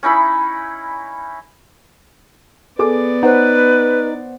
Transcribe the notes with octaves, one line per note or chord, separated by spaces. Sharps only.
C#4 D#4 E4 B5
B3 G#4 A4 D5 D6
D#4 B4 C5 F#5